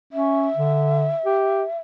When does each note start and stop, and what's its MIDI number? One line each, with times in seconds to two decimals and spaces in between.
0.13 0.48 61
0.13 1.79 76
0.57 1.10 50
1.26 1.63 67